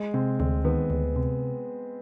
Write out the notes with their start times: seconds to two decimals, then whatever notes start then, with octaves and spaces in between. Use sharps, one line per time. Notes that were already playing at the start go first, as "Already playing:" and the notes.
Already playing: G#3
0.14 C3 C4
0.39 D2 C4
0.65 D#3 B3
0.90 D2
1.16 C3